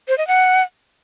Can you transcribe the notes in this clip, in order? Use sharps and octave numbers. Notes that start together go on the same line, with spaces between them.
C5
D#5
F#5